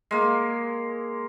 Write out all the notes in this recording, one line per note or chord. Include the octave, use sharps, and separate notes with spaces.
G#3 A#3